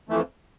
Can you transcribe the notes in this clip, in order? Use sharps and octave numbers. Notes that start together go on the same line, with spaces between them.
F2 E3 A3